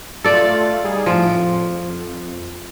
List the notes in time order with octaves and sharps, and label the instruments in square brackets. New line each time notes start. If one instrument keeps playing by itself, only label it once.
[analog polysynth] A3 F4 A6 [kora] A4 D5
[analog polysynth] G3 D#4 G#4
[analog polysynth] A2 D7 [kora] F3
[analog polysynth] F2